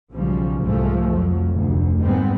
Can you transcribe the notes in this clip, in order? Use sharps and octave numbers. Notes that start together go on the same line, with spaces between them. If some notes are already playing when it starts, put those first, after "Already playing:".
B1 C#3 F3 G3
C2 G#2 F3 G#3 A3
F2 F3 F#3
F1 D2
G#2 D#3 G3 G#3 B3 C4